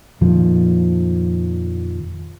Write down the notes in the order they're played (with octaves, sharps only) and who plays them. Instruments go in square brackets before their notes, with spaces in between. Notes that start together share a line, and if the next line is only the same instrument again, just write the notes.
[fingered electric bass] F2 A#2 D#3 F3